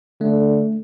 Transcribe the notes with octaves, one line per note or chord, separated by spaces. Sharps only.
D3 A3